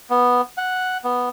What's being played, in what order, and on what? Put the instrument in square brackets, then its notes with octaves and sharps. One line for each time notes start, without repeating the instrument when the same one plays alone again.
[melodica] B3
F#5
B3